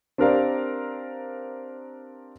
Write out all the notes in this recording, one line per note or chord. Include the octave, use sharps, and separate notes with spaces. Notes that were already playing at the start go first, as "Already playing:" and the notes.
C4 D4 G4 A#4 D5 F5